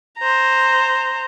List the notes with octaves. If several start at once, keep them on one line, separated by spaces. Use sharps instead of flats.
C5 A#5